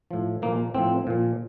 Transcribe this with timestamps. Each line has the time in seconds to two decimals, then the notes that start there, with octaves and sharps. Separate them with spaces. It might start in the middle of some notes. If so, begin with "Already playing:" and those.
0.11 A2 F3
0.42 A#2 F3 A#3
0.74 A2 F3 C4
1.07 A#2 F3